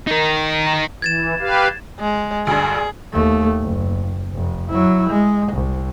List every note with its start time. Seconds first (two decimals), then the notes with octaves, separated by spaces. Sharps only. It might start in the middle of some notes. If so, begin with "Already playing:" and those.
0.07 D#4 A#4
1.02 E3 G#6 A6 E7
1.40 G4 B4 F5
2.00 G#3
2.47 D2 G2 G#4
3.13 D#2 A3
3.61 F#1
4.33 F1
4.70 F#3 E4
5.10 G#3
5.53 C2